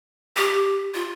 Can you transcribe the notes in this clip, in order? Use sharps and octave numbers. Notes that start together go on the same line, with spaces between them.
G4
F4